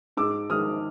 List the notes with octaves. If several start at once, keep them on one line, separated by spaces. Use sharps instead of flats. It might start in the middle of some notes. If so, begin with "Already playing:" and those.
G#2 D6 E6
D#3 G#3 D#6 F6